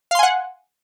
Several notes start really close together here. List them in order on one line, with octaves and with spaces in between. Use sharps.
F5 C6 G#5 F#5